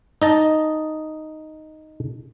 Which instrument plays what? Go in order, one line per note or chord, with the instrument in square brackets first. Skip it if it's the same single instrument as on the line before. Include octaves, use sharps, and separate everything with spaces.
[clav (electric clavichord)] D#4 D#5 A5